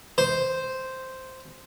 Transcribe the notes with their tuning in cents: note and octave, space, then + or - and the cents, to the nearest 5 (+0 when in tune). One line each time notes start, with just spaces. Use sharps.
C5 -5